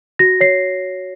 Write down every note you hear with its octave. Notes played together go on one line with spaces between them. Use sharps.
F#4 A#6
C#5 C7